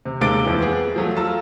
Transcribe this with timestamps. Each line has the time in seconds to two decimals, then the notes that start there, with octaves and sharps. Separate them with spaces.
0.05 C3
0.21 D#2 C3 G#3 D6 A6 D7
0.45 F2 E3
0.61 B3 G#4
0.96 F3 F#3 A3
1.16 F4 A4 A5 A#5 E6